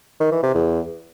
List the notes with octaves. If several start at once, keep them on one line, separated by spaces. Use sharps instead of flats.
D#3
E3
C3
E2